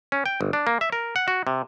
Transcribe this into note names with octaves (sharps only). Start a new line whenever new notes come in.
C#4
G5
G1
D4
A#3
E5
A#4
F#5
F#4
C3